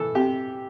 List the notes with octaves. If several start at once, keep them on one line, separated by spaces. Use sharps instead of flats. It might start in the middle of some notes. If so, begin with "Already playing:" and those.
Already playing: E3 A4
C3 G4